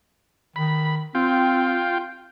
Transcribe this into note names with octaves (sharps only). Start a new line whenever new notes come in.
D#3 B5
C4 F4 G5